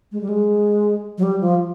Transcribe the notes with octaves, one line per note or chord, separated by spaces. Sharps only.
G#3
G3
G#3
F#3
G3
F3